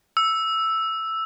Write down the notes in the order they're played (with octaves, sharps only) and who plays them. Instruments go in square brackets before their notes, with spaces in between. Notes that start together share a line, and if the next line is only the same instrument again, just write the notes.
[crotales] E6